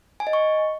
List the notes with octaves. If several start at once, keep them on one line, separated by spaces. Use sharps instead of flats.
G#5
D#5
C#6